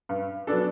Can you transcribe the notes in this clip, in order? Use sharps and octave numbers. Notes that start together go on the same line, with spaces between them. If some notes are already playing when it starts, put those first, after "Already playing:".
G2
F#3 B3 D4 A4